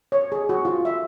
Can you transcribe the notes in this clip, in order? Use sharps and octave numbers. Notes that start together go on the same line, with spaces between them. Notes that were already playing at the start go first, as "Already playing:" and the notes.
C#5
G#4
F#4
F4
E5